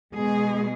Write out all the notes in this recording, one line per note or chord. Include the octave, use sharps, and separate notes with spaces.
B2 G#3 G#4